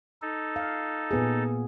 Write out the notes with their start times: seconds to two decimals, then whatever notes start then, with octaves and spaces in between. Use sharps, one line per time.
0.22 D#4 A4
0.56 F5
1.11 A#2 B3 G#4